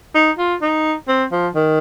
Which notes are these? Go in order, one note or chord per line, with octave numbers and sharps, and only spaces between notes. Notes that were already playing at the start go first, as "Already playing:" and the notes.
D#4
F4
D#4
C4
F3
D#3